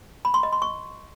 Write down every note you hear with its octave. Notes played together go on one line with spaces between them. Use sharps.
B5
C6
D#5
C6
C#6